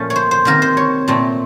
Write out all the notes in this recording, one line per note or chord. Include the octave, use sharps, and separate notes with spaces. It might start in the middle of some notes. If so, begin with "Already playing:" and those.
Already playing: A#2 F3 A3 C#4 A4
C#5
C5
C5
C3 D#3 A#3 A#4
C5
C#5
A#2 A3 C4